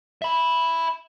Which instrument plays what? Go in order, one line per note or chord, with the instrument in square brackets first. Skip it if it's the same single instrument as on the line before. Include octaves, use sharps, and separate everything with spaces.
[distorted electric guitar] E5 B5